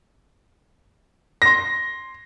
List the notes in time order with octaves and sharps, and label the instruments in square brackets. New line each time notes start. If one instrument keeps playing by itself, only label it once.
[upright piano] C6 A#6